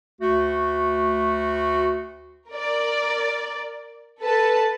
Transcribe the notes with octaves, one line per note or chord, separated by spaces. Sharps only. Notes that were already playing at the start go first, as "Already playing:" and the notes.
D2 A3 F#4
A#4 D5
A4 B4 A5